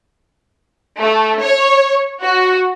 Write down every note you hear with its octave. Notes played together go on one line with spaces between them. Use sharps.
A3
C#5
F#4